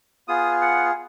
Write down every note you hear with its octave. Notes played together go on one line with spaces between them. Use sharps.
B3 F4 G#4 D#6
F#5